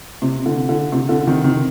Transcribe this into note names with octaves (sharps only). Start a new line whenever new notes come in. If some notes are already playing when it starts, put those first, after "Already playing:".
C3
D3
D3
C3
D3
C3 D#3
C3 D#3